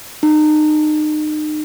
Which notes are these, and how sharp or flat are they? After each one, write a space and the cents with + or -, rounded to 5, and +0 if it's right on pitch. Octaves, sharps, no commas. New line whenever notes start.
D#4 -30